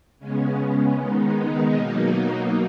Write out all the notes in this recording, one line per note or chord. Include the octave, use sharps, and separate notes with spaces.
C#3 G#3 B3 C#4
C#4
D#3 G#3 B3 D#4
B2 F#3 A#3